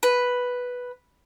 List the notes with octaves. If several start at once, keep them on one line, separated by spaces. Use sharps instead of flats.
B4